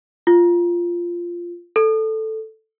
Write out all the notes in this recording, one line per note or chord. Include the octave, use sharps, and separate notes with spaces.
F4
A4